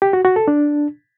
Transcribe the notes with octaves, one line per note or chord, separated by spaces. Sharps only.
G4
F#4
F#4
A4
D4